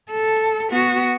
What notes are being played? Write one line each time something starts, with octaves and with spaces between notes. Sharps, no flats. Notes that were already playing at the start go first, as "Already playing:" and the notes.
A4
B3 F#4